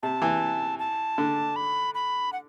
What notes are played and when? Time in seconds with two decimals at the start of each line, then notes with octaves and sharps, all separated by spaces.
0.03 C3 A5
0.22 E3
0.79 A5
1.18 D3
1.56 B5
1.94 B5
2.33 F#5